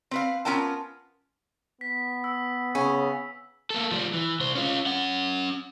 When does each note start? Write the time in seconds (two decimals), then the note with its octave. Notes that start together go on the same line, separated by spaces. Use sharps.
0.11 C4 B4 F5
0.45 B3 C#4 F4 A#4 G5 A5
1.81 B3 B6
2.24 E6
2.75 C#3 C#4
3.70 A#3 A4
3.91 F3 G3
4.13 E3
4.40 C2 C5
4.55 C#4 F4
4.86 C#4 F#5